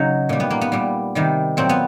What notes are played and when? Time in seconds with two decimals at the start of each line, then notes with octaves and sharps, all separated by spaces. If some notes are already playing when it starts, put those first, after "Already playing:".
Already playing: C#3 F#3 D#4
0.29 A#2 G3
0.40 B3
0.51 A#3
0.61 B3
0.72 A#2 G3
1.15 C3 D#3 G3
1.57 A#2 F#3 C4
1.69 B3